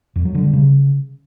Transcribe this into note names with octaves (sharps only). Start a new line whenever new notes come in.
F2
F#3
D3
G3
C#3